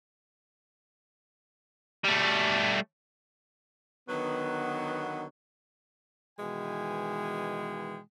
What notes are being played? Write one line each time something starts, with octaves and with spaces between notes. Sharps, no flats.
G3 A3
D3 D#3 F#3 B3
B2 D#3 E3 G#3 G5 G#5